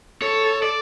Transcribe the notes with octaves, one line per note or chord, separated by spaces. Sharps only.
A4 C#5
D5